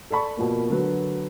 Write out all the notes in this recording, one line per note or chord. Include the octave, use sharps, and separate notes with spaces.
A4 D5 A5 B5 C#6
B2 F3 A#3
D3 F#3 B4